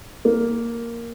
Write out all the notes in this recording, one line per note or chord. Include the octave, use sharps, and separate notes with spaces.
A#3